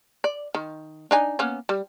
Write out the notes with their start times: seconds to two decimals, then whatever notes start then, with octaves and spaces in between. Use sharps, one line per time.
0.24 D5
0.55 D#3
1.11 D4 D#4 G#5
1.39 A#3 B3 C#4
1.69 G3